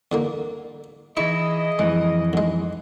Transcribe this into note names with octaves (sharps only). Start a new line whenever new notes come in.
E2 D3 A#3
E3 D#4 E4 G#4 D#5 C#6
F2 E3 G#3
B1 G#3